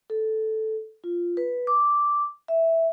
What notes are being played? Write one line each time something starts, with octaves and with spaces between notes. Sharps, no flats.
A4
F4
B4
D6
E5